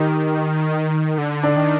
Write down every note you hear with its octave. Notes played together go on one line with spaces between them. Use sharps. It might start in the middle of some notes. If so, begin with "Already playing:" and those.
Already playing: D#3 D#4 G4
D3
D4
D#3